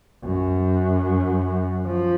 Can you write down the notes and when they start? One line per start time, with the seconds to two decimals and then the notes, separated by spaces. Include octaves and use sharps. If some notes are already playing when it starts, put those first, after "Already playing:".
0.24 F#2
1.85 F3